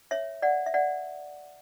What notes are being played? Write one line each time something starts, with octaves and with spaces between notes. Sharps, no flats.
C#5 E5
D5 F#5
E5
D5 F#5